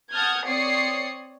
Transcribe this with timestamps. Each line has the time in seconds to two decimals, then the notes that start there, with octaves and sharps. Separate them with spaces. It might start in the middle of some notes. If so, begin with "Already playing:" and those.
0.14 F#5 A5 D#6 F6 G6 G#6
0.47 C4 C#5 D5 D#6 C7 C#7